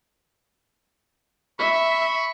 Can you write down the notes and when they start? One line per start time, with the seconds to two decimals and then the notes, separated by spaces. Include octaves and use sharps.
1.59 E5 B5 C#6